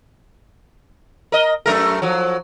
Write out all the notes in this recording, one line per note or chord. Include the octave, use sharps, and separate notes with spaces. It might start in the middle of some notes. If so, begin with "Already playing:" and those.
A#4 D#5
F#2 A3 A#4
F3 F#3